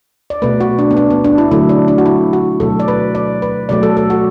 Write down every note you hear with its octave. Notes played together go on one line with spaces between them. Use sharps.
D5
B2 A3 B4
F#4
D4
B3
D4
B3
D4
E4
D3 F#3 A3 E4
D4
D4
F#4
E4
F#4
B2 F#3 A3 A4
D5
B4
D5
B4
B2 F#3 A3 D5
A4
A4
F#4